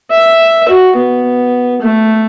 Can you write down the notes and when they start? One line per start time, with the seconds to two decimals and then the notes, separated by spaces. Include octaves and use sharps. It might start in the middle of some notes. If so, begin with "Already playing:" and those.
0.11 E5
0.68 F#4
0.97 B3
1.81 A3